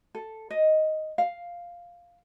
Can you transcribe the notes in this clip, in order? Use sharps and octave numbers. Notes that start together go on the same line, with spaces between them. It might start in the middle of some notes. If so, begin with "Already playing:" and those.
A4
D#5
F5